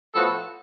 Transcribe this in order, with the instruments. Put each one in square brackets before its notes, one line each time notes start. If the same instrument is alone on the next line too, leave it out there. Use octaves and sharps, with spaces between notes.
[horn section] A2 F3 B3 F#4 A4